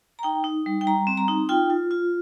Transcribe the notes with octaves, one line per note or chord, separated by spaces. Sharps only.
A#5
D#4 G5
D#4
G3
G5
G3 A#5
C4
A#5
D#4
F4 G5
F4
F4